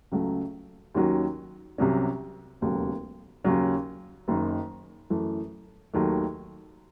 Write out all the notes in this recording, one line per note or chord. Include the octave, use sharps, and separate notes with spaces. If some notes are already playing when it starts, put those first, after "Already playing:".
C#2 C#3 F#3 A3
D#2 D#3 F#3 C#4 F#4
C2 C3 F#3 C#4
E1 D#2 C#3 F#3 A3
D#2 C#3 F#3 C#4
F#1 F#2 D#3
F#2 E3 A3
D#2 D#3 F#3 A3